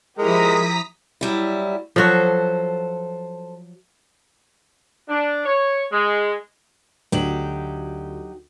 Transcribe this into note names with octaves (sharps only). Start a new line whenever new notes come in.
F3 G#3 E4 G4 A#4 A#5 D#6 B6
F#3 G3 E4
F3 F#3 F#4 A4 C5
D4
C#5
G#3
D2 F#3 D#4 G4 F#7